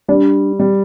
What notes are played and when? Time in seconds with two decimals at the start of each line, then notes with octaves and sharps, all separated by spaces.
0.08 G3 D4
0.59 G3